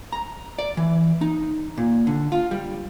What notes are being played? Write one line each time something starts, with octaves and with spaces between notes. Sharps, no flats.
A#5
D5
E3
D#4
A#2
D3
F4
G3